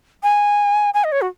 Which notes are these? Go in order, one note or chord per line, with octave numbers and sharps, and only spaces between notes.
G#5
G#5
D#5
C#5
F#4